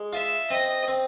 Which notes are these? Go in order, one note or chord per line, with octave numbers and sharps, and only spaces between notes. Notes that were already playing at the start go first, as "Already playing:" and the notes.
Already playing: G#3
F4 E5
C4 D#5
C4